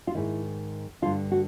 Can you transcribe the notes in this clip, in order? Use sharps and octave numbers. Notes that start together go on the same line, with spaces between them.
F4
G#2 D#3 E4
G2 D3 F4
F#4